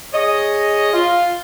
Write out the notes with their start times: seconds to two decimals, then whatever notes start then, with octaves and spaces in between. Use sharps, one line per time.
0.13 G#4 C#5 D#5
0.93 F4